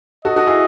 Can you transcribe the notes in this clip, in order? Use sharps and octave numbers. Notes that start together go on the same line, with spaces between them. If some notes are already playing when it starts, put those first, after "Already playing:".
F#4 A4 D#5
F#4 A4
E4 G#4